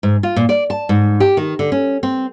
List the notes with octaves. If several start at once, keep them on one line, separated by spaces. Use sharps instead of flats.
G#2
F4
A#2
D5
A5
G#2
G4
D#3
D3
C#4
C4